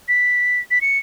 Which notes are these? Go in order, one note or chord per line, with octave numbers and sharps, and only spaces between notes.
B6
B6
C#7